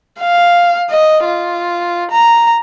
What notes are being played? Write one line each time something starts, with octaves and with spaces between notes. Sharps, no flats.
F5
D#5
F4
A#5